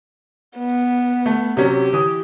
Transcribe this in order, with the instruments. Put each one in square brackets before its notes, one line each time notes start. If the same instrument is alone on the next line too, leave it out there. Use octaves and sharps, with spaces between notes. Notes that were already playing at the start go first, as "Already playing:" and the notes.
[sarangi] B3
[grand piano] A3
[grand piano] C3 F#3 C#4 [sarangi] G4
[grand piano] E3 D#6